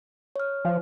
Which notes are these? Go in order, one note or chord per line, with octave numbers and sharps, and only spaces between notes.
C#5 F6
F3